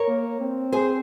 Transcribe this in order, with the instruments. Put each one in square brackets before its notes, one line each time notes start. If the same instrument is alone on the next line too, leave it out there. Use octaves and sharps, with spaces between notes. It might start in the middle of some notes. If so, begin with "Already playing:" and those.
Already playing: [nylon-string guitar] A#4 C#5
[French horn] A#3
C4
[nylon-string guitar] G#4 C5